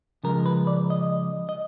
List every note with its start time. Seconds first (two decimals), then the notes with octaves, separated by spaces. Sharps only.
0.23 C#3 F3 G#3 A#4
0.46 B4
0.67 D5
0.90 D#5
1.49 D#5